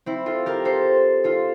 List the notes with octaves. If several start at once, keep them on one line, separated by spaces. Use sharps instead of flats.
C4 E4
F4 A4
G4 A#4
A4 C5
F4 A4